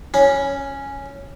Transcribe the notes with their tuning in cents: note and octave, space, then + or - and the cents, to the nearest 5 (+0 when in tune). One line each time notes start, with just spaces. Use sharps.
C#4 +0 B5 +0